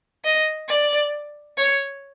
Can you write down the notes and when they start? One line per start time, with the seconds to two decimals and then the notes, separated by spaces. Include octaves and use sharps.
0.24 D#5
0.69 D5
1.58 C#5